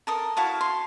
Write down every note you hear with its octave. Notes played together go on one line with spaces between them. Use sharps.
A4 A#4 D#6
E4 F#4 F5 A5
C6